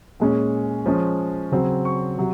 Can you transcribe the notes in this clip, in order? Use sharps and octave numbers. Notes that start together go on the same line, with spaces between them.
A#2 G#3 C#4
F3 G#3 C#4
C#3 F#3 C4
C#6
C3 F#3